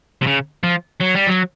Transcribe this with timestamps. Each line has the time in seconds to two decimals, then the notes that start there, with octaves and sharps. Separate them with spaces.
0.22 C3
0.26 C#3
0.64 F3
1.01 F#3
1.15 G3
1.28 F#3